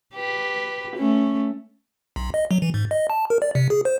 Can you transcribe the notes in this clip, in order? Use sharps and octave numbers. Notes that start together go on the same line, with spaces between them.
G4 B4
A3 C#4
B1
D#5
F#3
E3
G#2
D#5
A5
A#4
D5
C3
G#4
C5